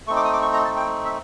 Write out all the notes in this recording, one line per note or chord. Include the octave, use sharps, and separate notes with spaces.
A3 C4 D#4 C#6
D6
D#6
D6
C#6
A#5
A5
G5
E5